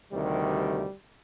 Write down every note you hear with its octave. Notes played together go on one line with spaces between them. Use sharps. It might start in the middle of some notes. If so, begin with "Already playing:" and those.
D2 C3 D#3 G3